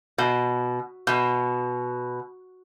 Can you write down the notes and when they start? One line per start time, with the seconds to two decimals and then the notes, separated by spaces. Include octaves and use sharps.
0.18 B2
1.07 B2